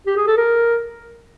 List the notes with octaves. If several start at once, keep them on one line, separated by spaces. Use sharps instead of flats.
G4
G#4
A4
A#4